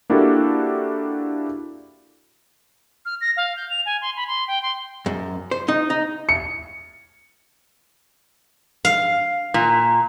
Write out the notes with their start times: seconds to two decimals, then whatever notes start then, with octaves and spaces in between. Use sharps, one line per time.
0.10 A#3 D4 E4 F#4 G4 A4
3.05 F6
3.21 A#6
3.37 F5
3.56 G6
3.70 F7
3.86 G#5
4.02 C6
4.16 B5
4.28 C6
4.48 G5
4.63 C6
5.06 F#2
5.51 C5
5.68 D#4
5.90 D#4
6.29 C#7
8.85 F5
9.54 A#2